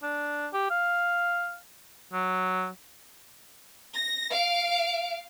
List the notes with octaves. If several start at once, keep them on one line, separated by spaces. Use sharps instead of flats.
D4
G4
F5
F#3
A#6
F5 D7